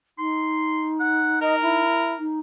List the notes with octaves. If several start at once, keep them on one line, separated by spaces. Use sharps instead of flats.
D#4 C6
F#5
A#4 D#5
E4
D#4